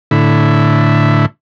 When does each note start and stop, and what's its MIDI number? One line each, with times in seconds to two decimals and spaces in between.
0.11 1.26 45
0.11 1.26 50
0.11 1.26 64